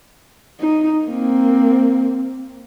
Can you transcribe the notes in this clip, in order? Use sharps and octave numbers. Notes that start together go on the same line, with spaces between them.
D#4
A#3 C4